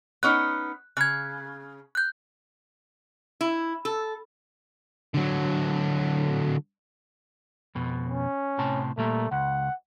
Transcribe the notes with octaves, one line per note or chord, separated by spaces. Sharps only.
B3 C#4 D#4 F#6
C#3 F#6 G#6
F#6 G6
E4
A4
D3 F#3
F2 B2
C#4
A2 C3 A5
A#2 G3 A3 A#3
C#2 F#5